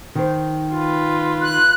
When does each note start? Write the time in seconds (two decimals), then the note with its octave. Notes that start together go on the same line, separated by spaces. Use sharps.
0.15 D#3 C5
0.74 F4 B4
1.42 F#6